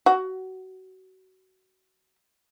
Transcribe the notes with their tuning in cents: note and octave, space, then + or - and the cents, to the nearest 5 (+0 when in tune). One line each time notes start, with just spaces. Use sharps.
F#4 +25